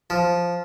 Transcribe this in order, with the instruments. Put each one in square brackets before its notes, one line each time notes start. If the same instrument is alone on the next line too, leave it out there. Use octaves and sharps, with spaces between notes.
[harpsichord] F3